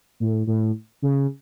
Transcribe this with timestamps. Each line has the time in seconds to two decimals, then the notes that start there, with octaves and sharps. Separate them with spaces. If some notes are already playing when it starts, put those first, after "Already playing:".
0.20 A2
0.47 A2
1.02 C#3